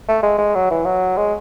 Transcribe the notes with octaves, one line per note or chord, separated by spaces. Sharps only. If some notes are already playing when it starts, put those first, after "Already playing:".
A3
G#3
G#3
F#3
E3
F#3
G#3